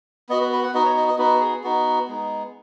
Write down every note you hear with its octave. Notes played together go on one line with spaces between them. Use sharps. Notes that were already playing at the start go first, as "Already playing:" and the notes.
B3 F#4 D#5
B4
B4
F#5
B3 D#4 F#4 D#5
C#5
D#5
D#5
B3 D#4 F#4 B4
G#4
B3 D#4 F#4
G#3 B3 D#4